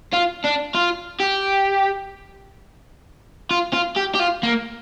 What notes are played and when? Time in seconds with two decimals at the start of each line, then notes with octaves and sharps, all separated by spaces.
0.13 F4
0.44 D4
0.74 F4
1.20 G4
3.51 F4
3.73 F4
3.96 G4
4.15 G4
4.19 F4
4.43 A#3